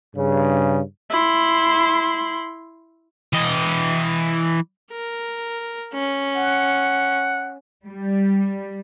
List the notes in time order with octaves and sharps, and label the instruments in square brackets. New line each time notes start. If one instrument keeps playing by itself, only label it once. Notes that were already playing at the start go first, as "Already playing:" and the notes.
[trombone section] G2 C#3
[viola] E4 C6
[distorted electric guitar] E3 D#5
[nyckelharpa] A#4
C#4
[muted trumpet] F#5
[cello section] G3